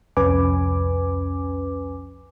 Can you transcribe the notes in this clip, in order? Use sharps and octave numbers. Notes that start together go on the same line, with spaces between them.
C2 F2 C#4 B4 G#5 D6